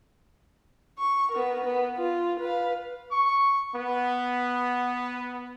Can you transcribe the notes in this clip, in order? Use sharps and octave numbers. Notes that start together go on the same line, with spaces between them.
C#6
B3 A#4
B3
F4
B4 F5
C#6
B3